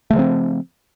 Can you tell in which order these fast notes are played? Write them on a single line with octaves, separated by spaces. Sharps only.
A3 C#3 F3 C4